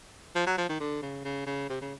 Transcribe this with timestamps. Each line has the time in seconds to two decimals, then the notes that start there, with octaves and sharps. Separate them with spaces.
0.35 F3
0.46 F#3
0.58 F3
0.69 D#3
0.80 D3
1.02 C#3
1.24 C#3
1.46 C#3
1.69 C3
1.81 C#3